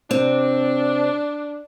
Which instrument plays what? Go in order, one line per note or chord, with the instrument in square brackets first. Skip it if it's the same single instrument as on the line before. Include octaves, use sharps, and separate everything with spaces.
[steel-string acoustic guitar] C3 C4 [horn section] D4